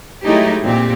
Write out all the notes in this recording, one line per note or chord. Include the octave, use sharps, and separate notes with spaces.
F#3 G#3 A3 D#4 E4 G4
A#2 C4 G4